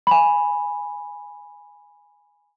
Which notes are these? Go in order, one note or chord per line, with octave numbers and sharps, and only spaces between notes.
G#5 B5